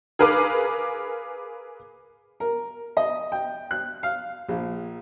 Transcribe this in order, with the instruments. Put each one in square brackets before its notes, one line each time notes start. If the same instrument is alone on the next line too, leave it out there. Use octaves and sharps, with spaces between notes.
[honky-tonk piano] G#4 A#4 B4 F5 D6
[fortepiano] A#4
D#5
G5
F#6
F5
A#1